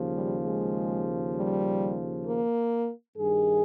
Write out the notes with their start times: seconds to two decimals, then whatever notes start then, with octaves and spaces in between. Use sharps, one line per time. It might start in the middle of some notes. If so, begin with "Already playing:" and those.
Already playing: D#2 C#3 F3
0.13 G3
0.43 G#3
1.35 G3
2.26 A#3
3.18 G2 D#3 G#4